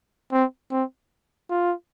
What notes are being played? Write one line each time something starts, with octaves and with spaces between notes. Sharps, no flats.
C4
C4
F4